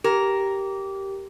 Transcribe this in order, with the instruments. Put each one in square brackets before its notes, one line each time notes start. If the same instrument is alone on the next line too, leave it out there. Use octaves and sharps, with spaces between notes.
[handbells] G4 [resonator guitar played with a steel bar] A#4